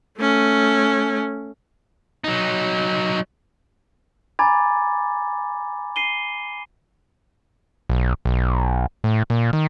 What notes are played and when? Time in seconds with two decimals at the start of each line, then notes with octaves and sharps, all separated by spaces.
0.19 A3 C#4
2.24 F#3 D#4
4.39 G#5 A#5 B5 D6 G#6 A6
5.96 C7 D#7 G7
7.90 B1
8.25 B1
9.04 A2
9.30 A#2
9.53 D#3